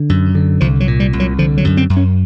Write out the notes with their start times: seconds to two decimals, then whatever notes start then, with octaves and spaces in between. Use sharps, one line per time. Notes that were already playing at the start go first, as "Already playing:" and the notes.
Already playing: D3
0.09 F#2
0.35 D3
0.61 C2 F3
0.80 F#3
0.87 A#2
1.00 G3
1.13 C2
1.20 F#3
1.39 D3 F3
1.58 F#3
1.65 F#2
1.77 C4
1.90 F#2
1.97 C#4